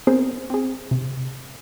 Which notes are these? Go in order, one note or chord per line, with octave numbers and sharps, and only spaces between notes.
B3 C4 G#4 A#4 C5
C4 G#4
C3